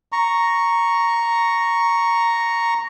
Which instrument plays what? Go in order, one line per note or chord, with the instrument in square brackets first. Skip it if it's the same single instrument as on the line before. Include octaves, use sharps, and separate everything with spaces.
[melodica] A#5 C#6